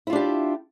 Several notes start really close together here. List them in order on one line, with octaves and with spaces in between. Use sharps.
E4 F4 D4 G4